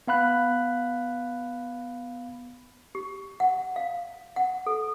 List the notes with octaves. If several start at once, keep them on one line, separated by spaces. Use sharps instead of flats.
B3 F5 B5 F#6
G4
F#5
F5
F#5
A4